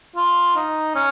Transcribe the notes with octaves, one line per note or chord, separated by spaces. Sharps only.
F4
D#4
C#4